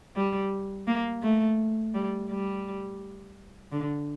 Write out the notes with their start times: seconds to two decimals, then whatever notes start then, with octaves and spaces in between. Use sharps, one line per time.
0.16 G3
0.87 A#3
1.23 A3
1.94 G3
2.30 G3
3.72 D3